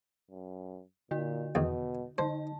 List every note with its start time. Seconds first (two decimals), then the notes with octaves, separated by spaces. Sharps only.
0.31 F#2
1.11 A#2 D3 F#4
1.55 E2 B2 D#3
2.18 D3 D#4 C5 A5